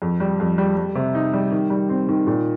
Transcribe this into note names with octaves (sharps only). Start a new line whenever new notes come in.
F2
G3
F2
G3
G3
C3
D#4
G3
D#3
G3
C4
D#3
A#2